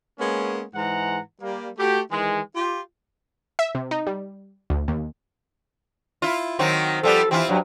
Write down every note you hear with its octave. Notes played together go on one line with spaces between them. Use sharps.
G#3 A#3 B3 C#4
G#2 E3 G#3 F#5 A#5
G3 A#3
A3 F#4 G4
D#3 E3 G#3
F4 G4
E5
C3
D#4
G3
D2
D#2
E4 F4
D#3 F#3 C4
F3 G3 B3 A4
E3 C4 E4 F4
G2 F#3